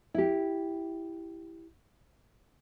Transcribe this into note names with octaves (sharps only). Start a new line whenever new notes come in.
E4 G4